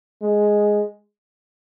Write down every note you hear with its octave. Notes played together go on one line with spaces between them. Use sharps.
G#3